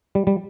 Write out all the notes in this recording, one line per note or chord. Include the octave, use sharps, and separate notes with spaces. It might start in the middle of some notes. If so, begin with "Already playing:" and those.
G3
G3